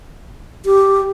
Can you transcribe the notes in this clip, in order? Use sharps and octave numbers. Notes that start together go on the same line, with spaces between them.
G4